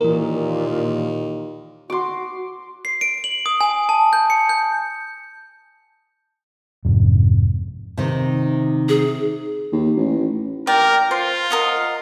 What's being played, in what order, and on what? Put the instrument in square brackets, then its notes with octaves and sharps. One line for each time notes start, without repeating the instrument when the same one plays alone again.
[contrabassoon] D#2 [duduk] A#2 [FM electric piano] E3 A#4
[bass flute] F#4 [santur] C6 D6
[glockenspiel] C7
D7
F#7
D#6
G#5
A5
G6
C#7
G6
[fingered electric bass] G#1 F2 G#2 C3
[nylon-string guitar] C3 D#3
[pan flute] G#4
[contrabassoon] D#2
A1
[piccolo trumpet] A#4 [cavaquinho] D5 G5
[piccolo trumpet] F4 [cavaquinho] C5
[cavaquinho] A#4 D#5 F#5